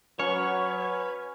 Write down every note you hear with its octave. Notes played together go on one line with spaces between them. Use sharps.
F#3 C#4 B4 C#5